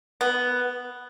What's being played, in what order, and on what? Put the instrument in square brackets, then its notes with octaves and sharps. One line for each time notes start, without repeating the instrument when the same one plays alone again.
[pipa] B3